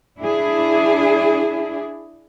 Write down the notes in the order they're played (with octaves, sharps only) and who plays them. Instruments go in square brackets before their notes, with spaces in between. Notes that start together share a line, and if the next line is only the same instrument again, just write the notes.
[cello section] D4 E4 G#4